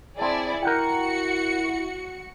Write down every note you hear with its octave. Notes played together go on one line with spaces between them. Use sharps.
C4 E4 G#4 D5 A5
E4 F#4 A#4 F#5 G5 C#7